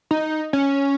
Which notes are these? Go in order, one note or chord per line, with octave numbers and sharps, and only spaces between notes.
D#4
C#4